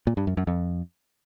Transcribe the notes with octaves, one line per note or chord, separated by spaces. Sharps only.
A#2
G2
F#2
F#2
F2